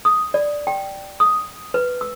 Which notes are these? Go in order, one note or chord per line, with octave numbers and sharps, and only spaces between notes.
D#6
D5
G5
D#6
B4
E6